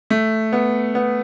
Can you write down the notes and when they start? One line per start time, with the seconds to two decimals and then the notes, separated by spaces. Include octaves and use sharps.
0.10 A3
0.53 B3
0.95 B3